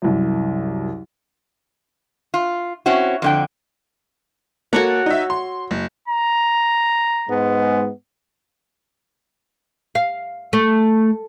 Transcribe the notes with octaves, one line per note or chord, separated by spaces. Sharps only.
C2 F#2
F4
C4 C#4 E4 F#4
F2 D3 G5
A#3 F#4 A4 C#5 F#5
D#4 E5
C6
F#1
A#5
G#2 G#3 B3
F5
A3